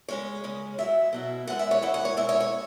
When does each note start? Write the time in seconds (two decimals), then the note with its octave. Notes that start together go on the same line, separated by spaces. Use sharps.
0.08 C#3 G#3 C#4 C#5
0.44 C#3 G#3 C#4
0.78 B2 F#3 E4 E5
1.13 B2 F#3 E4
1.47 F#2 E3 G#3 E4 F#5
1.59 E5
1.71 C#5
1.82 F#2 E3 G#3 E4 F#5
1.94 F#5
2.05 C#5
2.17 B2 G#3 E4 E5
2.29 C#5
2.40 C#5